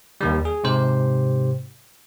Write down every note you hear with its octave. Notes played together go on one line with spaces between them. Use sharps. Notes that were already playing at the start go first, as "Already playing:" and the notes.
D#2 D#3 G3
G#4
G#2 C3 G4 C5